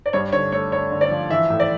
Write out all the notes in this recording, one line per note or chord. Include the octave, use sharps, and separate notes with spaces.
D5
G2 C#5
D3 C#5
A3 C#5
D3 C#5
D3
D5
F3
E3 E5
A2
D5